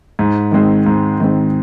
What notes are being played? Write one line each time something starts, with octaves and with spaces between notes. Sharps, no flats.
G#2
D#3 G#3 C4
G#2
D#3 G#3 C4